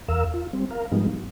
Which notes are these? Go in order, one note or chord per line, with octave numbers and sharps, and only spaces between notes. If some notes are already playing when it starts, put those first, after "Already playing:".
E2 A#4 F5 E6
F4
G3 C4
A#4 F5
G#2 F3 G3 G#3 B3 D#4
F#3